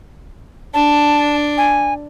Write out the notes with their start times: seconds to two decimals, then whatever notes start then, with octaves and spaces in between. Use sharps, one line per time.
0.74 D4 A5
1.58 G#5